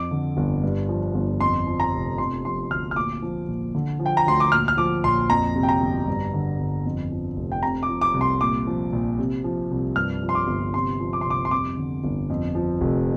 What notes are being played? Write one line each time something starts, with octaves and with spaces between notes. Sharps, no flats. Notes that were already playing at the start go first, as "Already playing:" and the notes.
Already playing: F2 D6
D3
G1
G2
F3
G1
F2 C6
F3
A#5
F1
C3 C6
F3 C6
D2 F6
F6
A#2 D6
F3
A#1
D3
F3
G5
A#5
D2 C6
D6
A#2 F6
F6
F3 D6
A#1 C6
F2 A#5
C3
G5
A#5
G1
G2
D3
G1
F2
F3
F1
G5
C3 A#5
D6
F3
D6
C2
C6
A#2 D6
F3
A#1
C3
F3
C2
G2 F6
F3
C6
D6
G1
C3 C6
F3
D6
C6
C2
D6
C6
F2 D6
D3
G1
F2
F3
F1